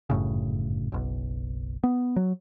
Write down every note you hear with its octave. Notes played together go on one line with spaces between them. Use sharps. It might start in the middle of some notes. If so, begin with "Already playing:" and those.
G1 F#2 A2 C#3
F#1 B1
B3
F#3